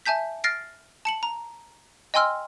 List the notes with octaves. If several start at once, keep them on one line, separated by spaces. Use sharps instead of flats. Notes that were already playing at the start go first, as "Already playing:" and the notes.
E5 G#5 A5 G6 B6
F6 A6 A#6 C7 D7
A5 C#7 F#7
A#5
D#5 G5 G#5 C6 E6 F6